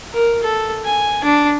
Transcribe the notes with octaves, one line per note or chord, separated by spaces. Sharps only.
A#4
A4
G#5
D4